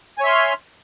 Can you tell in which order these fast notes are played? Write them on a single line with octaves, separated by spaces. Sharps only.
G#5 C#5 E5 C6 F6